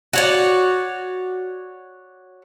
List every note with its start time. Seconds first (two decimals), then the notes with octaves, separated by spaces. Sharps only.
0.13 F#4 C#5 D5